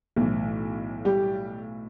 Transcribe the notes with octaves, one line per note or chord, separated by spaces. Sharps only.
B1 A2 E3
G3 G4